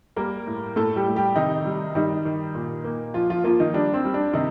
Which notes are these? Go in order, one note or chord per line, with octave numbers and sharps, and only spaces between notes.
G3 A#3 A#4
A2
A2 A3 A4
G3 G4
A2
G3 G4
C3 D#3 D#4
G3
D#3 G3 D#4
D#3
A#2
A#3
F3 F4
F3 F4
F3 A#3 F4
D#3 D#4
G3 D4
C4
G3
D4
C3 D#3 D#4